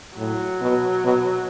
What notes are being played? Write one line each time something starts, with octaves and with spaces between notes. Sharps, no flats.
A2 F#3
B2
B2